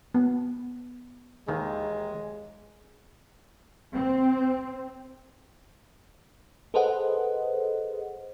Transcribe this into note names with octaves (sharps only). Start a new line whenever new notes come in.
B3
D#2 D#3 E3 G#3
C4
G#4 A4 B4 C5 D#5 F#5